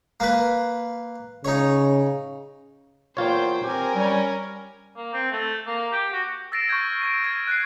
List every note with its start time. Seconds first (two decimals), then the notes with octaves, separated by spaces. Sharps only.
0.20 A#3 B4
1.45 C#3 D#4 C#5
3.17 E2 A#3 F4 C5 C#5 G5
3.64 C4 G4 A#4 G#5
3.95 G3 C#4
4.96 A#3
5.13 C4
5.32 A3
5.67 A#3
5.92 G4
6.13 F#4
6.52 E6 A6 A#6 C7 D7 E7
6.69 C#6 F6 G6 G#6
7.01 E6 G#6 D7 D#7
7.23 G6 G#6 D#7
7.47 F#6 G#6 C7